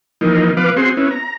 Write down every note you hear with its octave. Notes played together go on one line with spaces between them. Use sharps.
E3 F3 A#3 D#4
F3 B3 B4 F5 D6
C4 F#4 G#4 C6
B3 C#4 E4
A#5